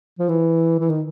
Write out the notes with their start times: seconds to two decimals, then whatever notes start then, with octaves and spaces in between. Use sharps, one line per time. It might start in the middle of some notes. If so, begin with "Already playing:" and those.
0.19 F3
0.29 E3
0.79 E3
0.90 D#3